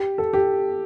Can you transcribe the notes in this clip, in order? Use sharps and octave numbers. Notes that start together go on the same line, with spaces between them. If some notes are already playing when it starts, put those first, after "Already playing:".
Already playing: G4
A4
G4